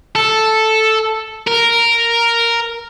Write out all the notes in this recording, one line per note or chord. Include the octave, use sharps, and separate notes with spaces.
A4
A#4